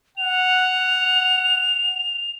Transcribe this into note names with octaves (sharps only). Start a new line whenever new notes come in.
F#5 F7